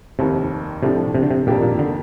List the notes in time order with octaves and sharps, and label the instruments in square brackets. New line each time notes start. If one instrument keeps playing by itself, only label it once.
[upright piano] F1 D#2 D#3 [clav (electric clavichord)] C3
[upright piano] A2 F3 A3 D4 [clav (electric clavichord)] C3
[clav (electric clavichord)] C3
D3
C3
[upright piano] F2 D#3 A#3 D4 G4 [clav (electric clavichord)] A#2
[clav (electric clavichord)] A#2
D3